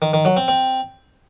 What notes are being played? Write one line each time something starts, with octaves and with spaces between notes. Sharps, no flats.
D#3
D#3
F#3
C4
C4